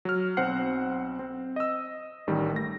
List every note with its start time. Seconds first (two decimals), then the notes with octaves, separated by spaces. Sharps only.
0.05 F#3 F6
0.37 B1 C4 C5 F#5 C7
1.19 C4
1.56 D#5 E6
2.27 A1 D#3 G3
2.53 A3 A#6